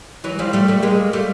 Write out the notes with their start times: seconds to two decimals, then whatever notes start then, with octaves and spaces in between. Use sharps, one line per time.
0.24 E3 F#3
0.39 F3 G3
0.53 G3 A3
0.68 G3 A3
0.83 G#3 A#3
1.13 G3 A3